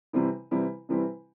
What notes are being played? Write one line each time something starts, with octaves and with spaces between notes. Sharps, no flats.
C3 E3 G3 C4 E4
C3 E3 G3 C4 E4
C3 E3 G3 C4 E4